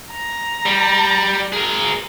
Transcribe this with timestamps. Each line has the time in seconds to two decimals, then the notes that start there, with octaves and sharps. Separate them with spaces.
0.11 A#5
0.66 G3
1.53 G#4 A#4